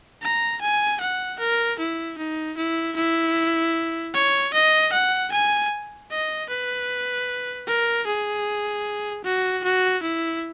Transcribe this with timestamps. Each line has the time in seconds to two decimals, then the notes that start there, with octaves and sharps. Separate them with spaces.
0.22 A#5
0.61 G#5
1.00 F#5
1.39 A#4
1.79 E4
2.18 D#4
2.57 E4
2.96 E4
4.14 C#5
4.53 D#5
4.92 F#5
5.32 G#5
6.10 D#5
6.49 B4
7.67 A#4
8.06 G#4
9.24 F#4
9.63 F#4
10.03 E4